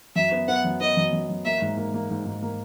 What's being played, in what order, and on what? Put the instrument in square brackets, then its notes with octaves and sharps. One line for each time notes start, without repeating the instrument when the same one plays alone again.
[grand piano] F#2 [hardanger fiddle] E5
[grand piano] B3
[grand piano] B3 [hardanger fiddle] F#5
[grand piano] F#2
[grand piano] B3 [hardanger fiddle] D#5
[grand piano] F#2
F#2
F#2
[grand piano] A#3 [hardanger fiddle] E5
[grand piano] G#2
A#3
A#3
G#2
G#2
A#3